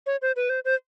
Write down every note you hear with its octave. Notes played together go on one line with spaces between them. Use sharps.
C#5
C5
B4
C5
C5